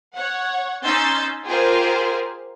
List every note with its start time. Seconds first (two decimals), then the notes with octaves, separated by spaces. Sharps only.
0.15 C#5 F#5
0.85 C#4 D#4 C6 E6 G6 A6
1.46 F4 G4 G#4 A#4 C5 F5